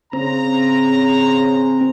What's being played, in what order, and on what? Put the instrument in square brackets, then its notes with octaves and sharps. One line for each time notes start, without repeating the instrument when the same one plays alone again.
[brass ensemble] C#3 A#5 [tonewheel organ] C4